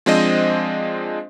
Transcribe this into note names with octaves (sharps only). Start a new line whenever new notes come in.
F3 G#3 C4 D4 C5 D#5